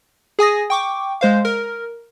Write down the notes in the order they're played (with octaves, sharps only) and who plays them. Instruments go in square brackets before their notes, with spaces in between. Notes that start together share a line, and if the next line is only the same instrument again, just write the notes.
[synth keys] G#4 G#5 D#6 A#6
G5 C#6 D6
G#3 C5 F5
A#4